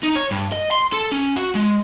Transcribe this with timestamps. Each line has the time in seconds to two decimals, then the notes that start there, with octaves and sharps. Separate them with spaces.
0.03 D#4
0.15 C#5
0.31 G2
0.52 D#5
0.71 C6
0.93 A4
1.12 C#4
1.36 F#4
1.55 G#3